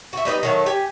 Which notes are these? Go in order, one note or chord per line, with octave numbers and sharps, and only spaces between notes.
F#4 E5
G3 D#4 B4 D#5
D#3 F#3 A3
G4 G#5